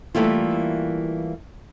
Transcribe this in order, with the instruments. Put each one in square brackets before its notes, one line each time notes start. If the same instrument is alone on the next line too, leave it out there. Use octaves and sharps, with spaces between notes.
[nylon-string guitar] E3 G3 A3 A#3 F4